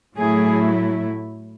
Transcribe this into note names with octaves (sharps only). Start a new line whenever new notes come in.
A2 F#3 A3 E4 G#4